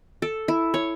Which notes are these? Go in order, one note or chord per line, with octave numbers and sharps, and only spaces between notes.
A4
E4
C#5